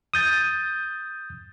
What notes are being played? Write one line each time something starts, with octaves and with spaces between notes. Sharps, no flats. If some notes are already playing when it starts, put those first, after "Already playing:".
D#6 G6 A6